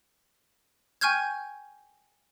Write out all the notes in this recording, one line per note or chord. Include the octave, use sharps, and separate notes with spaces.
G5 G#5 C#6 F6 G6 G#6